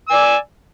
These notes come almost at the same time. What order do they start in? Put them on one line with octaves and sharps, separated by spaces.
E6 G#5 D5